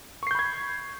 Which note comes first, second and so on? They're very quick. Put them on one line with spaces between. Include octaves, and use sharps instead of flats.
C#6 C7 G6 B5 G#6